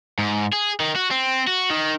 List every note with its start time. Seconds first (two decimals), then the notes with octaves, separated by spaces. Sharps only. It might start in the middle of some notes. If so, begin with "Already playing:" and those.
0.19 G#2
0.53 G#4
0.80 D#3
0.96 F#4
1.11 C4
1.47 F#4
1.71 D#3